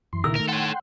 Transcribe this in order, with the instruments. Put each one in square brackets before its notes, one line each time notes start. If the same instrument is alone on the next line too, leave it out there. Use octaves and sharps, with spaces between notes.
[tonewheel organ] F#2 E3 C6
[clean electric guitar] C#2 D#3 A#4 [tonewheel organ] A#2 E4 [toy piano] E6
[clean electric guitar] D#3 A3 [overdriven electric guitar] A#4
[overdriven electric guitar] A4 C#5 [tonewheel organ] F#5 G5 C6